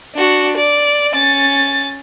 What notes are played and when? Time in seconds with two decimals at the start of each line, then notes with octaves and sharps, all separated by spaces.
0.15 D4 F#4
0.58 D5
1.13 C#4 A6